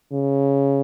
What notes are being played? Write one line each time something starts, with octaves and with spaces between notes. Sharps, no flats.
C#3